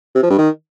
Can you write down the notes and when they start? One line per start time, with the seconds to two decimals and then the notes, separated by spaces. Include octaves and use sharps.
0.15 C3
0.23 F3
0.30 G2
0.38 D#3